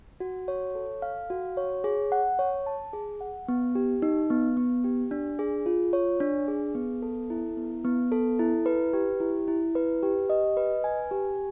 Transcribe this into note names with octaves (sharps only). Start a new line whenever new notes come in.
F#4
C#5
A4
F5
F#4
C#5
G#4
F#5
C#5
A5
G#4
F#5
B3
G4
D#4
B3
B3
G4
D4
G#4
F4
C#5
D4
G#4
B3
A4
E4
B3
B3
A4
E4
B4
G4
E4
E4
B4
G4
D#5
B4
G#5
G4